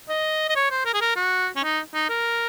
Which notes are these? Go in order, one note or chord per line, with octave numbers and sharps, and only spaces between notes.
D#5
D#5
C#5
C5
A#4
G#4
A#4
F#4
C#4
D#4
D#4
A#4